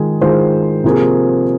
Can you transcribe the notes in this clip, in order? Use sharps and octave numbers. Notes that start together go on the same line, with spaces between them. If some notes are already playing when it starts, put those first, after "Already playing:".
Already playing: D#3 G#3 F4 G#4
D#3 G#3 F4 G#4 C5
C3 F3 A#3 G#4